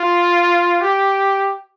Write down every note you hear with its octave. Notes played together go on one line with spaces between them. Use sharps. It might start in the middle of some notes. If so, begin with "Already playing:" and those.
Already playing: F4
G4